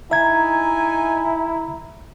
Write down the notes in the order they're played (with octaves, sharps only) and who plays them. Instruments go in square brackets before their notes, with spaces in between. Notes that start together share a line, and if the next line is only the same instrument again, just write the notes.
[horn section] D#4 G#5 [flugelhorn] E4 [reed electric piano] E5 G#6 [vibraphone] A#5